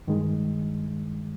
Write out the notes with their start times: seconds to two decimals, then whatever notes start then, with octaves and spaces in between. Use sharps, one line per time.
0.07 G2 D#3 G#3